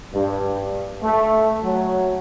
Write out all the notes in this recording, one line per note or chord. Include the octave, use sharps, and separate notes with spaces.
G2
A3
F#3